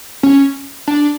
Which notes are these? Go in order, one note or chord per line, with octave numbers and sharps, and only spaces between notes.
C#4
D4